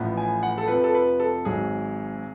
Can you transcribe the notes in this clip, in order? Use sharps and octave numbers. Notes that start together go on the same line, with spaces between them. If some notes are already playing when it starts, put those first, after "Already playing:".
Already playing: A1 A2 F3 B3
G#5
F#5
A4
F1 F2 F3 B4
A4
B4
A4
G#1 G#2 F#3 G#4